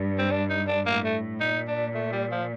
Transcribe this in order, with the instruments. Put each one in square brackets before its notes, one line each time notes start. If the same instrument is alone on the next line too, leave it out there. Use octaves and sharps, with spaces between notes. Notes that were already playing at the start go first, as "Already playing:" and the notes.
Already playing: [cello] G2
[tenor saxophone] C4
D4
D#4
D4
[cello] A2 [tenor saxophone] A#3
[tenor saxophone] A3
[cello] A#2 [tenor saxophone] D#4
[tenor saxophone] D4
A3
G3
F3